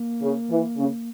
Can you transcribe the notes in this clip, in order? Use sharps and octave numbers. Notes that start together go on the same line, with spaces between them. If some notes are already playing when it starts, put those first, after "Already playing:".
Already playing: A#3
C#3
E3
C#3